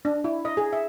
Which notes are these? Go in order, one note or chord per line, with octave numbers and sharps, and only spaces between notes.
D4
E4
D#5
G#4
E5